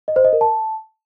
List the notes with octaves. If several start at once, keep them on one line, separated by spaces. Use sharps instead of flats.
D#5
C5
D#5
A#4
A5